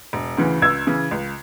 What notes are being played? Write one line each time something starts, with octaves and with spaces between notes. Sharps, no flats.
E1
D2 C#3 E3
C#2 E6 G#6
C#3 E3
C#2